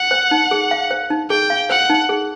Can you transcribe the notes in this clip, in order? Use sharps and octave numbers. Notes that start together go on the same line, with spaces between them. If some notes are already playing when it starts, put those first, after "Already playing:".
Already playing: F#5
C5
D#4
G#4
F5
C5
D#4
G#4 G5
F5
C5 F#5
D#4
G#4